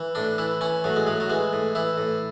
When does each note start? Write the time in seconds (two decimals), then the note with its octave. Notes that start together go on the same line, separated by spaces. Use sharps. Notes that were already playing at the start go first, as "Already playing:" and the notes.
Already playing: E3
0.15 A2 D4
0.38 E3 E4
0.61 E3 C#4
0.84 A2 F#3
0.96 G#3
1.07 A2 F#3
1.20 F#3
1.30 E3 G#3
1.53 A2
1.75 E3 E4
1.98 A2